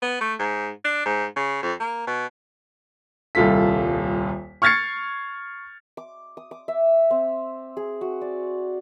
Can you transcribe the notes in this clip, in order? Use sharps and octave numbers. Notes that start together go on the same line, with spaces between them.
B3
A3
G#2
D4
G#2
C#3
F2
A#3
B2
D#1 C2 F4 A4 B6
C#6 F6 G#6 A6 C7 C#7
D6
D#6
D6
E5
C4
G#4
F#4
D5